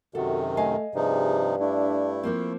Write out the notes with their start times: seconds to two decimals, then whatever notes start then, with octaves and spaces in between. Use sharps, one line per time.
0.15 F#2 C3 D#3 F#4 A4
0.57 A3 D#5 F5 G#5
0.95 G2 C3 F3 D#4 G#4
1.60 A3 D4 E4
2.23 F3 A#3 C4